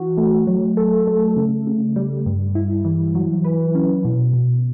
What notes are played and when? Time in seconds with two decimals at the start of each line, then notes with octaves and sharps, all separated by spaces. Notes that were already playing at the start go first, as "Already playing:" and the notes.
Already playing: E3 F#4
0.17 A3
0.47 F#3
0.77 A4
1.07 A3
1.36 C#3
1.67 C#3
1.96 G3
2.26 G2
2.55 E4
2.85 E3
3.15 F#3
3.44 B4
3.75 C#4
4.05 B2
4.33 B2